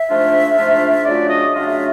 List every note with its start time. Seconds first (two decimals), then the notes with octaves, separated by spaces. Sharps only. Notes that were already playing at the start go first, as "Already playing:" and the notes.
Already playing: E5
0.09 G#2 F3 A3 D4 F4
0.57 G#2 F3 A3 D4 F4
1.04 C#3 F#3 A3 D4 F4 D5
1.29 D#5
1.53 C#3 F#3 A3 D4 F4 E5
1.69 E5